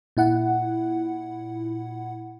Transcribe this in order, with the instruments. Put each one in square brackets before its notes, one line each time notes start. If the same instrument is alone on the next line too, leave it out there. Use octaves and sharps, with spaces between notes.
[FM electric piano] A#2 E4 F#5